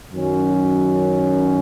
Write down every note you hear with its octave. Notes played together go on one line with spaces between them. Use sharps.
F#2 D#3 F#3 C#4